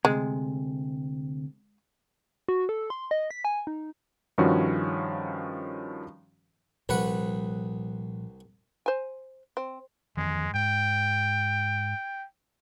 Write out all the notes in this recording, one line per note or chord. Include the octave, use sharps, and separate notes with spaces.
D2 C3 G#3
F#4
A4
C6
D#5
B6
G#5
D#4
G2 D#3 F3 C#4 F#4
C2 A#2 F3 G3 B4 F#5
C5 G#5
C4
F2 D#3 E3 G#3
G#2 G5